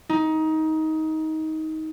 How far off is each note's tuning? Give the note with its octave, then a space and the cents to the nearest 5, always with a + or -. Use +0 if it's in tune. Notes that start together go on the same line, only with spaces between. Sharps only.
D#4 +20